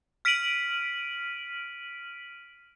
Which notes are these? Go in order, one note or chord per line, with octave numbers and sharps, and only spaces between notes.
F6 B6 D7 D#7 F#7